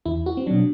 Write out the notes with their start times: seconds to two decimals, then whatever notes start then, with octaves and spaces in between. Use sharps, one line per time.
0.05 E2 E4
0.26 F#4
0.37 C4
0.46 B2 F#3 D4